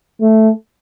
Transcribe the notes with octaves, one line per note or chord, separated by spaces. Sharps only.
A3